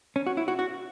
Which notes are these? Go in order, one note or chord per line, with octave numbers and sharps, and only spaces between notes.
C#4
F#4
E4
F#4
F#4